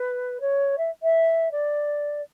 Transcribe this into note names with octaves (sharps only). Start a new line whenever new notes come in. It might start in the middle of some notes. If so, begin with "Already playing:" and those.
Already playing: B4
C#5
E5
E5
D5